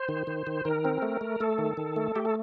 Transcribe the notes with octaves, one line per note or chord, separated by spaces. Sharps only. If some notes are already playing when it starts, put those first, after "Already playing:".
Already playing: C5
D#3
D#3
D#3
D#3 A#4
C4
A3
A3
A3 A4
D#3
D#3
A3
A3 G4
A4